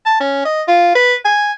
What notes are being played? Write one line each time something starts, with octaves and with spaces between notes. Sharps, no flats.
A5
C#4
D#5
F4
B4
G#5